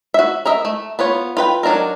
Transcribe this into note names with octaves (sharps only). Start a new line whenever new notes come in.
F#4 E5
A#4 D#5 E5
A3
B3 F4 C#5
F4 B4 G5
F#3 D4 D#4 A#4